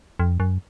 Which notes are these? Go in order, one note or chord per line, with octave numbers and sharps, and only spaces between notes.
F2
F#2